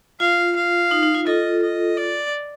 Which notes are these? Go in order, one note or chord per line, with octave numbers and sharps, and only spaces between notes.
F4 F5
F5
D#4
D#4
F4
F4 A4 D#5
D#5
D5